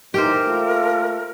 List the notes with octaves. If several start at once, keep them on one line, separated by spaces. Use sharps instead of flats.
A#2 E3 D#4 G4 A#4 C5
A3 A#3 F4